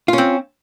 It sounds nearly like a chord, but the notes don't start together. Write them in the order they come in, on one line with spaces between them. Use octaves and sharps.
F4 C#4 C4